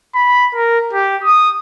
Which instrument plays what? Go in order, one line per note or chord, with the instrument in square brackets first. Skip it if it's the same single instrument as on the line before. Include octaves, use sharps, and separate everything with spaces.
[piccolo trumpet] B5
A#4
G4
D#6